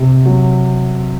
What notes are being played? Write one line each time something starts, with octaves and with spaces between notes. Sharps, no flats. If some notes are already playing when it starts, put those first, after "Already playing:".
Already playing: C3
F#3